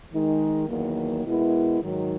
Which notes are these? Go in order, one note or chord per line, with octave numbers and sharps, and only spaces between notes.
D#3 G#3 D#4
E2 D#3 F#3 A#3
B2 G#3 B3 E4 A#4
G#2 D#3 F#3